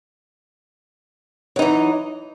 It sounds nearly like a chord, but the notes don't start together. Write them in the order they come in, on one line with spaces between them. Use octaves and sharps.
F#3 D#4 E3